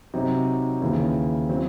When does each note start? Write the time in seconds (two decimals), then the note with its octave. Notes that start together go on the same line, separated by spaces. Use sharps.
0.14 C3 F#3 C4 D#4
0.81 D#2 C#3 E3
1.49 F#3 C4